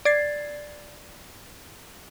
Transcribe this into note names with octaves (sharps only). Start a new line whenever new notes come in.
D5 G#6 A6 C7